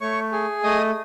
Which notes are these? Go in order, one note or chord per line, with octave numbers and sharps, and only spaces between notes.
A3 C#5 C#6
G#4
A3 D#5 D#6